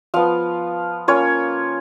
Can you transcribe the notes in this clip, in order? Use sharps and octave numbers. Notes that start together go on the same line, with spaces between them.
F3 B3 F4 F5
A#3 C#4 F4 C#5